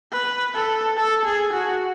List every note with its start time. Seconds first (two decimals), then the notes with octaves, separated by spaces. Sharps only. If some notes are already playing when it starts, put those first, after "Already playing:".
0.12 B4
0.55 A4
0.97 A4
1.25 G#4
1.53 F#4